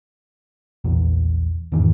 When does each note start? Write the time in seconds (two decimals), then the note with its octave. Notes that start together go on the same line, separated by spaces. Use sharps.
0.84 A#1 E2 A#2
1.72 E2 G#2 D#3 E3